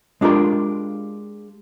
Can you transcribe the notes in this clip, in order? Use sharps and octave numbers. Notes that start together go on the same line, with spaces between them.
G#3 D4 F4 G4 A#4